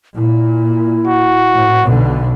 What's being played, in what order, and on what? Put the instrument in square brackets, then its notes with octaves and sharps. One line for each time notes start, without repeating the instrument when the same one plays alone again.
[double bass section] A#2 [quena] E4
[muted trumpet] F#4
[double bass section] A2
B1 B2 D3